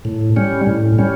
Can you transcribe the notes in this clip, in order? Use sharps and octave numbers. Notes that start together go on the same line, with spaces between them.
A2
G3 C#4
A2
G3 C#4